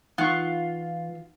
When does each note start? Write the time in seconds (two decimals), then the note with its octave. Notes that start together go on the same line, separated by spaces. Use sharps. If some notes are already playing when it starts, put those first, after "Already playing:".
0.18 E3 D#4 F4 F#5 C#6